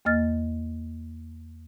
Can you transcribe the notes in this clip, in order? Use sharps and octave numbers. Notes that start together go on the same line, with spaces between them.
E2 A#3 D#5 F6 A6